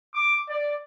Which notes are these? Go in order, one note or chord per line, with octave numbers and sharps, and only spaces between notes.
D6
D5